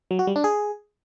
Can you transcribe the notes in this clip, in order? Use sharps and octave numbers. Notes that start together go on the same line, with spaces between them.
F#3
F#4
G3
D4
G#4